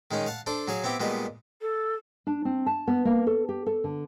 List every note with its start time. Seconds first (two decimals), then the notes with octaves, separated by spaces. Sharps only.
0.11 D#3 G#3 C#4 D#4
0.26 F5 F#5 A5
0.47 D4 A4 C5
0.68 F#3 G#4 F5
0.84 B3 C4 E4 G4
1.00 A#2 G3 G#3 B3 D#5
1.62 A4
2.27 D4
2.45 C4
2.66 A5
2.87 B3
3.05 A#3
3.27 A4
3.49 G4
3.66 A4
3.84 D3